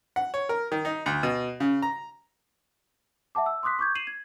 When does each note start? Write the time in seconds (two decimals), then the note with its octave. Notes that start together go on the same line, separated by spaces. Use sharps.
0.16 F#5
0.34 C#5
0.49 A#4
0.72 D#3
0.85 D#4
1.06 D2
1.23 B2
1.60 C#3
1.82 A#5
3.35 E5 F#5 A5 D6
3.46 E6
3.63 C6 D6 D#6 F#6 B6
3.79 C#6 D6 G6 G#6
3.95 C7 D#7 E7 F#7
4.07 G#6